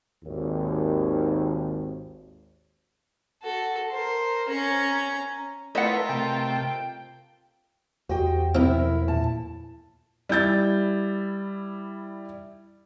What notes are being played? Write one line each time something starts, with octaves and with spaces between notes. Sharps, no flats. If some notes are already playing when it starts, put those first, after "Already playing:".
G#1 D#2
F#4 A4
A#4 C5
C#4 A#5
A3 E4 F4 A#4 B4 D#5 F#5
C3 A3 G5
E2 F#4 G4 C5 D#5 G5
B2 F3 C4 D#4 E4 A#4 F6
A#2 A5
G3 E4 G6 A6